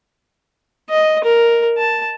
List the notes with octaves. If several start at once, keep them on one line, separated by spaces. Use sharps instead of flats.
D#5
A#4
A5